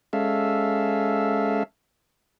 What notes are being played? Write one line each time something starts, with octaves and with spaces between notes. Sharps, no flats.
G#3 C#4 A4 E5 F5